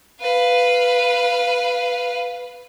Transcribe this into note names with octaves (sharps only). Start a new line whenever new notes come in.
B4 F5